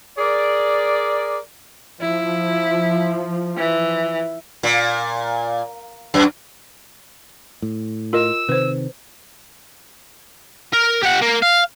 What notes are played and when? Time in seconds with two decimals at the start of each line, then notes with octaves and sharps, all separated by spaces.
0.19 G#4 A#4 D5
2.01 F3 E4
3.58 E3
4.63 A#2
6.14 F#2
7.62 A2
8.13 F4 A#4 D#5 E6
8.49 C3 D#3 B4 C5
10.73 A#4
11.03 G4 F#5
11.22 A#3
11.43 F5